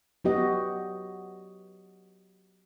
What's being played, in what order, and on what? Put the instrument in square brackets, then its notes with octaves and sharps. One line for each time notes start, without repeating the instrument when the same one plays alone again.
[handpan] F#3 B3 F#4 G4 D#5